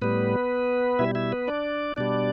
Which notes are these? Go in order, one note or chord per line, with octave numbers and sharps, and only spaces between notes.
A2 G3 B3 B4
B2 G3 E4 E5
E4 E5
B3 B4
D4 D5
B2 G3 D4 D5